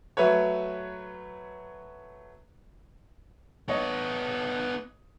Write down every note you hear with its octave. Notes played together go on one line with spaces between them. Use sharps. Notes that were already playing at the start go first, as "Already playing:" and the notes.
F#3 A3 B4 C#5
B3 A4 C#5 D#5